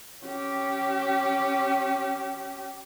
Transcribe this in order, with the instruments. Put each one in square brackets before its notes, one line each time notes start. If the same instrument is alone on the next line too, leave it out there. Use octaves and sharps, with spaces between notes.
[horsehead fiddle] C#4 G4